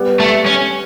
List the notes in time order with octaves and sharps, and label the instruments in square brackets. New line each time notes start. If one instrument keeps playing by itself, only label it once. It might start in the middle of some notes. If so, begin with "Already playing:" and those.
Already playing: [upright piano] G3 B3
[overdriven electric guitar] A3
C#4